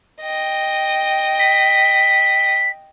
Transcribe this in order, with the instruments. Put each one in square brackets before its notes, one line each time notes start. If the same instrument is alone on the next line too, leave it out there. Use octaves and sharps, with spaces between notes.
[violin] D#5 G5
[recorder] B6